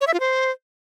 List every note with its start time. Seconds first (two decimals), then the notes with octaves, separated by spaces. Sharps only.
0.01 C#5
0.07 E5
0.14 F4
0.20 C5